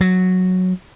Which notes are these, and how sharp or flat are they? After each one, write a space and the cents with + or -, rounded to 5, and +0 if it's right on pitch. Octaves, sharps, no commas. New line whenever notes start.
F#3 -5